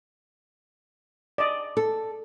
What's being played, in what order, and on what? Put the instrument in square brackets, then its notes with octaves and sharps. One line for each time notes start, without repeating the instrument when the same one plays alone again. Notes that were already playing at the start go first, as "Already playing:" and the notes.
[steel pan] D5 D#5
[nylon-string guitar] A4